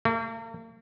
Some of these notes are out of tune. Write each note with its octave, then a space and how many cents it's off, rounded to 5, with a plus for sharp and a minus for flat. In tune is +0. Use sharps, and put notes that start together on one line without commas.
A#3 -45